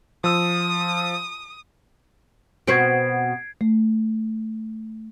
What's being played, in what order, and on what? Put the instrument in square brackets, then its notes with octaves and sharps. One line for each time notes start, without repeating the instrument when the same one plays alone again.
[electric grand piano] F3 E6 [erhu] D#6
[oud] B2 C4 F#4 [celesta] G#6 C7 D7
[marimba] A3